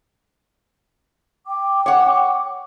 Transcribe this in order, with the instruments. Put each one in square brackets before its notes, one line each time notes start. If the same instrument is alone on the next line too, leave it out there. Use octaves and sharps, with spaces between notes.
[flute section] G5 D6
[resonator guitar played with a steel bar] C#5 F#5